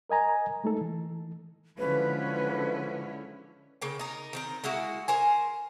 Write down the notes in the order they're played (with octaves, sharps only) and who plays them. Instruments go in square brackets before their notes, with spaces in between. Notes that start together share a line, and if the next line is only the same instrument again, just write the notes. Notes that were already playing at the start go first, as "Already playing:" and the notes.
[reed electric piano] A#4 D#5 G#5 A#5
G#3 A3 D#4 A4
E3
[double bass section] D3 [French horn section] F3 F#3 G#3 [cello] C#4 E4 [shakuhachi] B4
[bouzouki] C#3 A#3 G5
D#4 A#4
D#3 C4 A#4
G#3 A#3 E4 F#4
A#4 C5 G#5